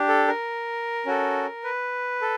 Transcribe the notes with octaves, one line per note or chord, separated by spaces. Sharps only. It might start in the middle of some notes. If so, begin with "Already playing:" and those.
Already playing: D4 G4
A4
A#4
C#4 F#4 A4
B4
A4